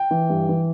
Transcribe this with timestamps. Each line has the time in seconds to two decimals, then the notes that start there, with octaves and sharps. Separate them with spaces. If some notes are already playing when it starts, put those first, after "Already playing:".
Already playing: G5
0.11 E3
0.30 G2
0.49 E3